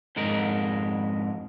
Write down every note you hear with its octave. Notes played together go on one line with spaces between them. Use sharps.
F2 G#2 G#3 A#4